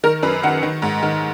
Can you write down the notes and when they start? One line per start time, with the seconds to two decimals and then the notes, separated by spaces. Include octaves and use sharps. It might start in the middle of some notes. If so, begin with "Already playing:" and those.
0.03 D#3 A#4
0.23 F#2 B4
0.43 D#3 F#5
0.63 D#3
0.82 G#2
1.03 D#3